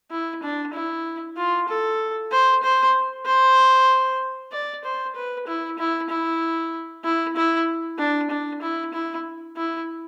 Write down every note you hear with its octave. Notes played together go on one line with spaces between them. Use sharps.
E4
D4
E4
F4
A4
C5
C5
C5
D5
C5
B4
E4
E4
E4
E4
E4
D4
D4
E4
E4
E4